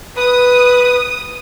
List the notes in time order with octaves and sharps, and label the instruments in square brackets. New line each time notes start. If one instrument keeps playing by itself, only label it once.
[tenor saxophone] B4 [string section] D#6